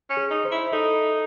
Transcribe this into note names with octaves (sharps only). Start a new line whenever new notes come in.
C#4
G#4
D#4
C5
E4
D#4 A4